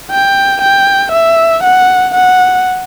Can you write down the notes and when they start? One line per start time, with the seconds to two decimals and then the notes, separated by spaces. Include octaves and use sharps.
0.11 G5
0.61 G5
1.12 E5
1.63 F#5
2.14 F#5